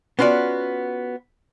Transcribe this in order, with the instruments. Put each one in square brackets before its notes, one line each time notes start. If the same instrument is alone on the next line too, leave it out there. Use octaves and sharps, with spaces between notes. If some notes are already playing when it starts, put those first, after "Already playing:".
[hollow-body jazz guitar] B3 C#4 F4 F#4 D5